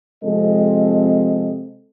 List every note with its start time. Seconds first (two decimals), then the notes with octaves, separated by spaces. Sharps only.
0.23 C3 F3 G#3 C4 A4 D#5